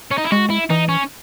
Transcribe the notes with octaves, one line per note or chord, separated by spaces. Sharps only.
C#4
D#4
E4
G#3 F#4
E4
E3 D#4
C#4